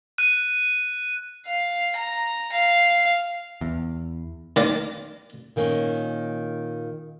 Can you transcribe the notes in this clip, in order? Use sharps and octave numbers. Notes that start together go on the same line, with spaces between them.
F#6 D#7
F5
A#5
F5
E2
D#3 A#3 D5
A#2 D#3 A#3 C#4